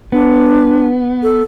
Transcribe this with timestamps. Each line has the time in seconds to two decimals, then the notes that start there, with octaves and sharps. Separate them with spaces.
0.12 B3 D4
1.23 A4